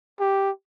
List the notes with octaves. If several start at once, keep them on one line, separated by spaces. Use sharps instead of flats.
G4